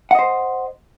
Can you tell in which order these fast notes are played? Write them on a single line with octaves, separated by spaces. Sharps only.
F#5 D#5 C5